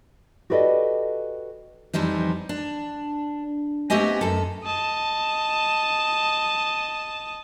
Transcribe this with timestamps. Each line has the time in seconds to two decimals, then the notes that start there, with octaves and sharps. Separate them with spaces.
0.50 F#4 G4 A4 B4 D5 D#5
1.94 F2 E3 F3 G3 D#4
2.49 D4
3.90 A3 B3 C4 G4 D#5 G#5
4.21 F#2 A4
4.64 D#5 A5